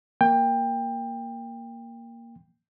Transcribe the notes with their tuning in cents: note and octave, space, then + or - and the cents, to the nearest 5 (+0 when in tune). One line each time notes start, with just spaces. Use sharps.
A#3 +0 G5 +20